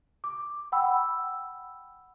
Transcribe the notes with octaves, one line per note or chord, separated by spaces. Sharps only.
D6
F#5 G5 B5 E6